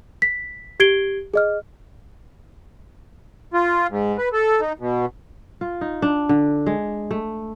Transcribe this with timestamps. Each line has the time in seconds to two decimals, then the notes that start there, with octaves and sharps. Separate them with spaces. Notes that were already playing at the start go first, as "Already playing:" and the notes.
0.22 B6
0.80 G4 G#6 C7 D7 G7
1.34 G#4 D#5 F6
3.54 F4
3.90 G#2
4.18 B4
4.32 A4
4.61 D#4
4.79 B2
5.61 F4
5.81 D#4
6.02 D4
6.29 D3
6.67 G#3
7.11 A3